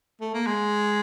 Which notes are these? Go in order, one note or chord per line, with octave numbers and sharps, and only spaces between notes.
A3
A#3
G#3